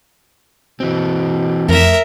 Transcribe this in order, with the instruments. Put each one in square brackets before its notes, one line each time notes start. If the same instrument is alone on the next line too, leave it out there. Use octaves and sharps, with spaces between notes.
[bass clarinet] B2 [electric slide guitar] E3 C4
[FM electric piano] F2 [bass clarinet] A3 [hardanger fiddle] A#4 E5